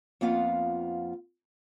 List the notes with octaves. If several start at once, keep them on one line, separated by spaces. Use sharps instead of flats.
F2 A#3 B3 F4 F5 F#5